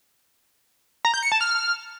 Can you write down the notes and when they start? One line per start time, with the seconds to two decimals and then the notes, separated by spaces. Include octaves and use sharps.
1.05 A#5
1.14 G6
1.23 C#7
1.32 A5
1.41 F6